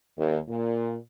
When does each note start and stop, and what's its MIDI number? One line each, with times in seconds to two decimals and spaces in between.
0.18 0.39 39
0.49 0.97 46